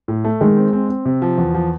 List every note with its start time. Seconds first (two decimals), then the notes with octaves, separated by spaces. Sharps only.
0.08 A2
0.24 A3
0.41 D#3 G#3
0.57 C4
0.73 C4
0.89 C4
1.05 C3
1.22 F3
1.38 E2
1.54 F3